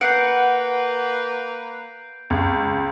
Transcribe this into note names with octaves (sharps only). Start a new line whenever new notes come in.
A#3 B4 F#5 G6 C7 D7
C#2